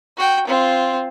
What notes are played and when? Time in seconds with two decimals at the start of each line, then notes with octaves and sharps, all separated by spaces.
0.17 F#4 G5
0.47 C4 F4